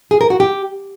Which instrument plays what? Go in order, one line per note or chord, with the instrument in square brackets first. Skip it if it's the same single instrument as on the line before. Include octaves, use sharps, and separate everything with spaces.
[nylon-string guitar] G#4
A#4
F#4
G4